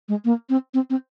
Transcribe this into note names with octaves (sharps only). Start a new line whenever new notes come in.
G#3
A#3
C4
C4
C4